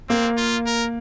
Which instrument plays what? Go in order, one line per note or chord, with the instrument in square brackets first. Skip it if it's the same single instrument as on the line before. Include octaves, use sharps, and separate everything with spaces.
[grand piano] A#3 [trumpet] C4
[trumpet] F4
A#4